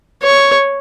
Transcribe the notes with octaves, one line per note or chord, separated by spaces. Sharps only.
C#5